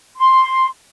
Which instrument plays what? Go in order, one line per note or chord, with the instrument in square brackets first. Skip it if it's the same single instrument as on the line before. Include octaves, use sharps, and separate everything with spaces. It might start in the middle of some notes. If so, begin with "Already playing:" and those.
[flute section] C6